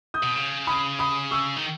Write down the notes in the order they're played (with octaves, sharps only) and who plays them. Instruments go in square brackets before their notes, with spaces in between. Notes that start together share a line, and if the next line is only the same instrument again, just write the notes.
[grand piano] D#6 G6
[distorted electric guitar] B2
C#3
[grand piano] B5 D#6
B5 D#6
C#6 E6
[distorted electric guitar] D#3